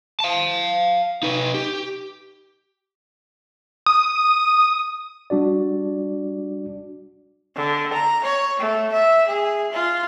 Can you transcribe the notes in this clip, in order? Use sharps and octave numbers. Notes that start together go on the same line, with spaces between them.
F5 A5
D#4 B4
G4
D#6
G3 D4 F#4 D5
D3
A#5
C#5
A3
E5
G#4
F4